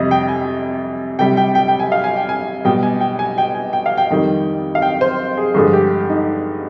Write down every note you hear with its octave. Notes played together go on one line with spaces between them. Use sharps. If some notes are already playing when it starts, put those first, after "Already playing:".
Already playing: F2 C3 G3 D#5
G5
G#5
C3 G3 G5
G5
G5
G5
G#5
F5
G#5
G5
G#5
B2 G3 G5
G#5
G5
G#5
G5
G#5
G5
F5
G5
F2 D#3 G3
F5
G5
C5
G#4
G2 D3 F3 G#3 G#4
G4
D#4